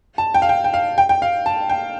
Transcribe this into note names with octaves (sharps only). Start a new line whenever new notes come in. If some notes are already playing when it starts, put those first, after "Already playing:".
A5
G5
F5
G5
G5
F5
G5
G5
F5
A5
G5